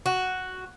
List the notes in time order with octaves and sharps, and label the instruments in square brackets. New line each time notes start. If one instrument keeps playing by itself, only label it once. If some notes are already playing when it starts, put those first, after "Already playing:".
[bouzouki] F#4